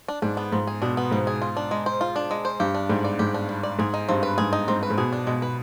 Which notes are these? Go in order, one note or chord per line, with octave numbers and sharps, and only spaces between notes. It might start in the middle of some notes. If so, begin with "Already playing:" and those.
D4
G#2 D4
B3
G#2 F3
G#4
B2 D4
B3
G#2 F3
G#4
F4
D4
G#3
C5
F4
D4
G#3
C5
G2 G4
D4
G#2 G3
D5
G#2 G4
D4
G3
D5
G#2 G#4
D#4
G2 C4
B4
G#2 G#4
D#4
G#2 C4
B4
G#2
B2 G#4
D4
B2 G#3
B4